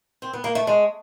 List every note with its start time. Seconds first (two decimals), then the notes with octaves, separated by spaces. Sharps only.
0.22 C4
0.33 B3
0.44 A#3
0.55 A3
0.67 G#3